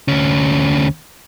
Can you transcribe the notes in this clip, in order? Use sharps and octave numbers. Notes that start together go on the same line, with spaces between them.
D2 C#4